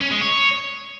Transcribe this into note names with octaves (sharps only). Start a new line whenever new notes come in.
C#4
G#3
C#5